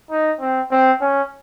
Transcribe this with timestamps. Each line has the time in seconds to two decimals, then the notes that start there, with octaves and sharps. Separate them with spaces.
0.11 D#4
0.40 C4
0.71 C4
1.01 C#4